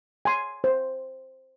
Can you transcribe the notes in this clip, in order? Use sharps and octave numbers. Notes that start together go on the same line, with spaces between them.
G#5 C6
C5